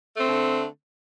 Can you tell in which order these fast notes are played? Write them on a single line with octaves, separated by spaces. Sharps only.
A3 C4 D3